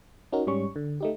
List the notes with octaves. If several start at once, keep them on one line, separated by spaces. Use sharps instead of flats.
C#4 D#4 F#4 A#4
G#2 G3 C#4 C#6
D3
A3 D#4 G4